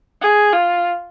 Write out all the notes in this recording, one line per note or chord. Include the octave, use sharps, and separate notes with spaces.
G#4
F4